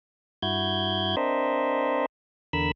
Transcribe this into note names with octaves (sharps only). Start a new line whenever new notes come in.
G2 E4 F#4 G6 G#6
C4 D4 A#4 C5 D#5 E5
E2 D3 A#4 B5 E6